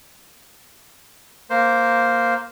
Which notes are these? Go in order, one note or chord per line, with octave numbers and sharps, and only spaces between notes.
A#3 C5